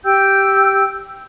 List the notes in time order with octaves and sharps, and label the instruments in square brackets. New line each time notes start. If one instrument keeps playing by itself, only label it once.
[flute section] G4 G5 E6 G6